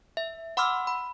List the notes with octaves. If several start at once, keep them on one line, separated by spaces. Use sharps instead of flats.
E5
F#5 B5 C6 D6 E6 F6
B5